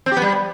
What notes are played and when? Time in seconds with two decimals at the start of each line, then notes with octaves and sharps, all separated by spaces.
0.06 C4
0.11 G4
0.17 B3
0.22 G3